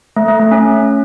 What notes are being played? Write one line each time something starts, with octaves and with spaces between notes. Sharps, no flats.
A3
A3
A3
C#4